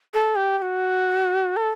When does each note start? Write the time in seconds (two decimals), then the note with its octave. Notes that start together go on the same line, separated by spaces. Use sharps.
0.14 A4
0.36 G4
0.58 G4
0.62 F#4
1.56 A4